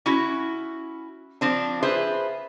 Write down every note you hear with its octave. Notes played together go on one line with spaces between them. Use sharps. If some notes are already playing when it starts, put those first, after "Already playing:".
C#4 E4 F#4
F3 C4 D4
F4 G#4 B4 C5 E5